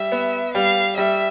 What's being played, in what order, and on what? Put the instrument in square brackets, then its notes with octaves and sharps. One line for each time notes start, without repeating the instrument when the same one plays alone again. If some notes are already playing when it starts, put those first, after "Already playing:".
Already playing: [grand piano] G3 [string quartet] E5
[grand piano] B3
[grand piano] G3 [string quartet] F5
[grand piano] G3 [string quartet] E5